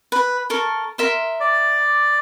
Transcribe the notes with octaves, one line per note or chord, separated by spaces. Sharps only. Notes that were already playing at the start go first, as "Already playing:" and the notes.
B4
A4 A#4 C#6
A#4 E5 C6
D5